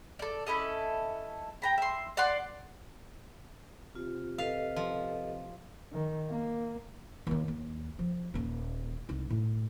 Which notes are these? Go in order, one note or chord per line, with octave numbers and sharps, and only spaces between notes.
A4 D5
C#4 E4 A4 D#5
G5 A#5 B5
E5 C6
D5 F#5 C6
C3 F4
A4 B4 D#5 F5
F3
D#3
A#3
D#2 D#3
D#2
F3
D#1 A#3
C2 D#4
A2